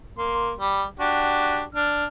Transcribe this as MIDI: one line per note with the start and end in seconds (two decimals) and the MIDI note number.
0.18 0.52 58
0.18 0.52 84
0.57 0.84 55
1.00 1.62 62
1.00 1.62 66
1.00 1.62 67
1.75 2.05 62
1.75 2.05 89